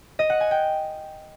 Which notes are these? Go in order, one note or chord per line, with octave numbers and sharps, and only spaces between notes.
D#5
F#5
G#5
G5